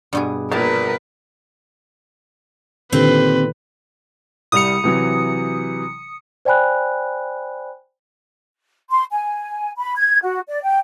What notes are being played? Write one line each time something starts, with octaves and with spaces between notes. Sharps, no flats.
G2 B2 G#4
A#1 A#2 A#4 B4 F5 A5
A#2 D3 D#3 C4 G4 B4 C5
C2 G3 D#6 C#7 F7
C3 E3 F#3
C5 D5 G5 G#5 B5 F#6
C6
G#5
B5
G#6
F#4
D5
G5